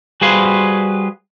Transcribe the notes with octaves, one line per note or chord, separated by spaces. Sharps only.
G3 F#4 G#4 B4 C5 F5